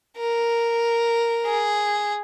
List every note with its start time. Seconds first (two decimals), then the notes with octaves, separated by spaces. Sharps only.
0.18 A#4
1.45 G#4